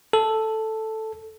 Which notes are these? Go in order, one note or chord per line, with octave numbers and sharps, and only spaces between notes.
A4